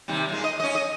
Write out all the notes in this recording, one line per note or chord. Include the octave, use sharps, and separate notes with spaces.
D#2 C3 G3
A#2 G#3
D#5
C#4 D#5
D#5